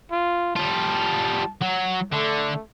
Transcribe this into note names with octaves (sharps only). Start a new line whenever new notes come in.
F4
G3 F4 A5
F#3
D3 A3